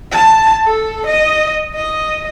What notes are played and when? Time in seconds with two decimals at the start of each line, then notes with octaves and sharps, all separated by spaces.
0.11 A5
0.65 A4
1.06 D#5
1.75 D#5